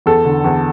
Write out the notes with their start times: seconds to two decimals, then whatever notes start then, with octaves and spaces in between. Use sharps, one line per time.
0.06 E2 A4
0.25 D3
0.44 E2